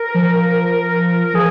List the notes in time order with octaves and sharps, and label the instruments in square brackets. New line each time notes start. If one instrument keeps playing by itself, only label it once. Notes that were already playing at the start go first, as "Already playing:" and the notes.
Already playing: [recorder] A#4
[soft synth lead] F3
[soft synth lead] F3 [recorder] G#4